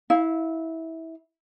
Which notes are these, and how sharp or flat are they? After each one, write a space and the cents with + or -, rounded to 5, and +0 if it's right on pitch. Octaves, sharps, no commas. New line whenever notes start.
E4 -20 F5 +5